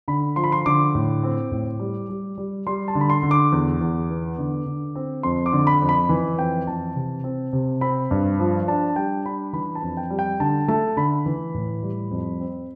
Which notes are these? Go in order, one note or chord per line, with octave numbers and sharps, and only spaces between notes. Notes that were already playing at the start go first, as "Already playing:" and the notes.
D3 B5
F3 C6
B5
C6
D3 D6
A2
C4
A2
G3
G3
G3
G3 C6
A5
D3
B5
C6
D3
D6
E2
E2
B3
D3
D3
C4
F2 C6
D6
D3
B5
F2
B5
E3
F2 G5
E3 A5
C3
C4
C3
C4 B5
G2
F3
D4 A5
G3 G5
D4 B5
E3 B5
A5
F2
G5
G3
G5
D3 A5
A3 A5
D3 B5
E3
A2
G3
F2
C4